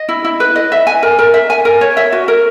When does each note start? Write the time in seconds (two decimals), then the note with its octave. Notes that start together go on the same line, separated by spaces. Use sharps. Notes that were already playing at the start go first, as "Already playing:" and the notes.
Already playing: D#5
0.09 E4
0.24 E4
0.40 B4
0.56 D#5
0.72 E5
0.87 G#5
1.03 A#4
1.19 A#4
1.34 E5
1.50 G#5
1.65 A#4
1.81 C#5
1.97 E5
2.12 F#4
2.28 A#4